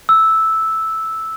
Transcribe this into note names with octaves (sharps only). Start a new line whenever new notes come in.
E6